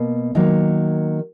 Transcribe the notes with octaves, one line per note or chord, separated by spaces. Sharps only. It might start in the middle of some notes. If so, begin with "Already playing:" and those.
Already playing: B2 A#3
D#3 F#3 A#3